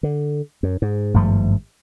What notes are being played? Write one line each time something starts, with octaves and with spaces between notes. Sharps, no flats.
D3
F#2
G#2
G#1 G2 F3 A3